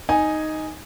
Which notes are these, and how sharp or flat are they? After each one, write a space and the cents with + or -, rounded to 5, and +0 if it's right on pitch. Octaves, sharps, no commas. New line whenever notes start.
D#4 +0 G#5 +0